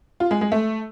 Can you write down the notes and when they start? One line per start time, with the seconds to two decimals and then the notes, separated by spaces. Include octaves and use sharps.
0.20 F4
0.31 G#3
0.41 G#3
0.52 A3